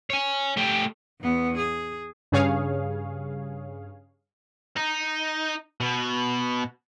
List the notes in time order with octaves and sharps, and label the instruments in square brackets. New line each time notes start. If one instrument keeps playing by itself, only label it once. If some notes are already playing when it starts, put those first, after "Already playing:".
[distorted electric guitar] C#5 G#5
A3 G4
[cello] E2 B3
G#4
[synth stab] G2 C#3 G#4 C#5 F5
[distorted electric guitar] D#4
B2